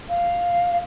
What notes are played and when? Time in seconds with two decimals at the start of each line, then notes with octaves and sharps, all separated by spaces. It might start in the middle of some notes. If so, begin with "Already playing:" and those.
0.09 F5